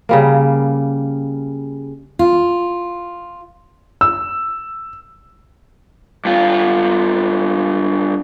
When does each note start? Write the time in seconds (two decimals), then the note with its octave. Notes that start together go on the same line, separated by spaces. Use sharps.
0.09 C#3 G3 A#3
2.19 F4
4.01 E6
6.25 G2 F4